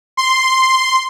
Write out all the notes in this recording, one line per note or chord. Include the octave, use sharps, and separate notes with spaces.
C6